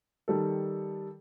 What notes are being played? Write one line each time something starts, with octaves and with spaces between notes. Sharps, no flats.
D#3 G3 A4